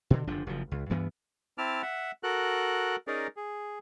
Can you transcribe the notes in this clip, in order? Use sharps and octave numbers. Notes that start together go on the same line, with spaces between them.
B2 D3
F1 D3 F3 D4
F#1 C#3 F3
C#2
D2 G2 E3 B3
C4 E4 A5 D6 F6
E5 F#5
F#4 A4 A#4 F#6
C#4 D#4 G#4 A#4 D5
G#4